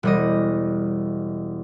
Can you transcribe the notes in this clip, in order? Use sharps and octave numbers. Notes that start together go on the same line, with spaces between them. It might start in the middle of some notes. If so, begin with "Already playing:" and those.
E1 G3 D#5